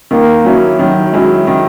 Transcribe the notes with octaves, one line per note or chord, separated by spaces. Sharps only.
D#3 A#3
F#3 C#4 E4
D#3 F#3
F#3 G#3 C#4 E4
D#3